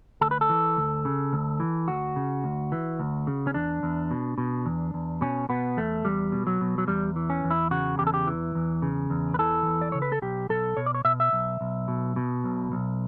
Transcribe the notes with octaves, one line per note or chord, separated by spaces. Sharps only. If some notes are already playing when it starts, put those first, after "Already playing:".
D2 A4
B4
A4
E3
D2
C#3
D2
E3
D2 F#4
C#3
D2
E3
D2
C#3
C#4
E2 D4
E2
B2
B2
E2
E2
B2 C#4
B2 B3
E2 A3
E2 G3
B2
F#3
B2
F#3
E2 G3
E3
C#4
E2
E4
C#3 F#4
E2 G4
A4
G4
E3
E2
C#3
E2
B4
E3 A4
E2
D5
C#3 C#5
B4
A4
B1 G4
B1 A4
B2 C#5
D5
C#5
B2 E5
E5
B1
B1
B2
B2
B1
B1